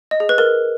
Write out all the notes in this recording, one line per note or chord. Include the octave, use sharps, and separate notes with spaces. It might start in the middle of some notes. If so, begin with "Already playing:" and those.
D#5
G#4
B4
A#4